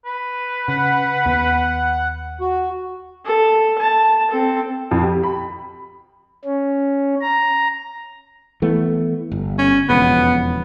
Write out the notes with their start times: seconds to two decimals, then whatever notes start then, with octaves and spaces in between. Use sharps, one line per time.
0.05 B4
0.68 C#3 F#5
1.26 D#2 B3
2.41 F#4
3.25 A4
3.79 A5
4.31 C4 A4
4.91 F2
5.03 G4
5.23 B5
6.44 C#4
7.21 A#5
8.62 E3 A3 B3
9.32 G1
9.59 C#4
9.89 E1 F2 C#3 B3